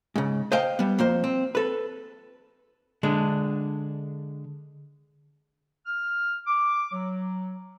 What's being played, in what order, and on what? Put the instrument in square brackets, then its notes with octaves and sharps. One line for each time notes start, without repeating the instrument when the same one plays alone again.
[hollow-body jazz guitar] G#2 C#3
C5 D#5 F5 G5
G3 B3
F2 A#3 C5
C4
A4 B4
D3 G#3 D4
[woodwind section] F6
D6
F#3